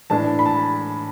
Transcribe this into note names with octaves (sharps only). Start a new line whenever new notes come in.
A2 E3 D4 A5
B5
A5